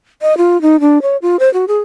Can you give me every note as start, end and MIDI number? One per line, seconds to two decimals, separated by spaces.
0.22 0.37 75
0.38 0.61 65
0.62 0.80 63
0.81 1.02 62
1.02 1.17 73
1.22 1.36 65
1.40 1.52 72
1.54 1.65 66
1.68 1.79 68